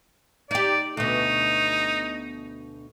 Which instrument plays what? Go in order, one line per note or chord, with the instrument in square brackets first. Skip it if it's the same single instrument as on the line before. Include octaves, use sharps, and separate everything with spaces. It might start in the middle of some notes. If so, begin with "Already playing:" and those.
[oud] D#4 G4 [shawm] D5
[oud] D2 B2 [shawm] D#4